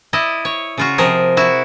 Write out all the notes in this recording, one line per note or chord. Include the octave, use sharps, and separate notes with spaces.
E4 D5 D#5
C#5
C#3 F4 F#4
C3 F3 G#4 A#4
E4 F#4